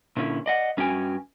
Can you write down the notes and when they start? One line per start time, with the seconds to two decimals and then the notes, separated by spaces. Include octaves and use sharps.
0.17 A#2 D3 C#4 E4
0.46 D5 D#5 F#5
0.77 G2 C#4 F#4 G#4 G5 G#5